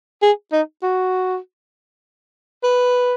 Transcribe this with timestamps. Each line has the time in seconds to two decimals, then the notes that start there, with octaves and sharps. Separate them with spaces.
0.22 G#4
0.52 D#4
0.83 F#4
2.63 B4